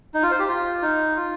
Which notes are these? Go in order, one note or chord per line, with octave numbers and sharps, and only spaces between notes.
D#4
F4
C5
G4
F4
D#4
F4